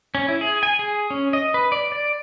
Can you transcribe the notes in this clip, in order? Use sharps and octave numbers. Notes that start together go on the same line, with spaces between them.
C#4
E4
G#4
G#5
G#4
C#4
D#5
B4
D5
D5